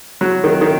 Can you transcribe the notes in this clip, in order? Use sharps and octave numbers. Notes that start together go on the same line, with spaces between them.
F#3
D#3
D#3